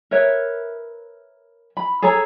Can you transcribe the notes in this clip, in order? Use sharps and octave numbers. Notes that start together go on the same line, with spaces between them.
A#4 B4 C#5 E5
B5
G#4 A4 C#5 A#5